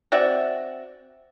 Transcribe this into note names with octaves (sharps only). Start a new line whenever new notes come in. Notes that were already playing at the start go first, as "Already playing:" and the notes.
C4 F#4 D5 E5